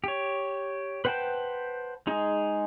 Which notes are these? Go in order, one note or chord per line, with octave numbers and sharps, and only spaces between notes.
G4 C#5
B4 C5 F#5 G5 A5
G#3 D#4 G#4